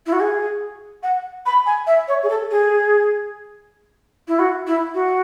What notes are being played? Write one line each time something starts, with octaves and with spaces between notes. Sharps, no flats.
E4
F#4
G#4
F#5
B5
G#5
E5
C#5
G#4
A4
G#4
E4
F#4
E4
F#4